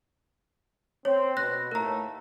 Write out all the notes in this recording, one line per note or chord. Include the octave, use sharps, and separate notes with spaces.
C4 C#5
B2 F#6 A#6
D#2 A2 A3 A#4 A#5